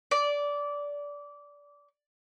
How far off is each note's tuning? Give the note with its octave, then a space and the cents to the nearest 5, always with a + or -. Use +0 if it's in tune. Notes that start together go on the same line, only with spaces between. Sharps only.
D5 -20